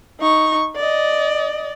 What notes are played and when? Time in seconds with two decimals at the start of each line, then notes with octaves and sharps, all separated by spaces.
0.20 D#4 C#6
0.76 D5 D#5